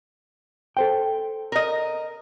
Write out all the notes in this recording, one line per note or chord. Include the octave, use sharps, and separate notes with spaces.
A4 C5 G5
A#4 D#5